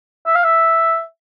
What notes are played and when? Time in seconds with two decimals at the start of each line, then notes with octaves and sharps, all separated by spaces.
0.27 E5
0.35 F5
0.44 E5